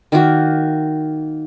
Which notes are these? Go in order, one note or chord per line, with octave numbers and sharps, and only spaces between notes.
D#3 A#3 F#4